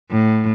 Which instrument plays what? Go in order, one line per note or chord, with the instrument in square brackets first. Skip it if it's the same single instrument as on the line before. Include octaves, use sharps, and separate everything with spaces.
[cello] A2